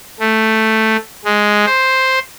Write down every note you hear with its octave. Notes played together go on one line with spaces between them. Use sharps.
A3
G#3
C5